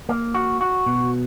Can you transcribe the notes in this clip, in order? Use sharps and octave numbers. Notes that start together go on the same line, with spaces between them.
A#3
F#4
F#4
B2